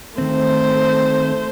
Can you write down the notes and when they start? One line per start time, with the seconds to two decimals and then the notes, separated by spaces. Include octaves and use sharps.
0.18 D#3 A3 C4 C5